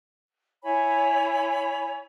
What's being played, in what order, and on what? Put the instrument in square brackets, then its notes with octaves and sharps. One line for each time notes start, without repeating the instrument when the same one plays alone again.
[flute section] E4 C#5 G#5 B5